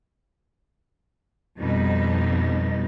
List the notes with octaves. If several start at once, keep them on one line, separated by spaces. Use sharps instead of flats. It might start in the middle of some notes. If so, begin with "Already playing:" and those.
F2 B2 G3 D#4